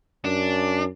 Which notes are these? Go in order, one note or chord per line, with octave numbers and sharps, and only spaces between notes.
F#2 D4